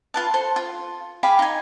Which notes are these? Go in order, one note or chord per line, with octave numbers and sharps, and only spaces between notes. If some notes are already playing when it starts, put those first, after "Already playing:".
F4 B4 A5
A4 C5
F4
G4 G#4 F5 B5
D#4 G#5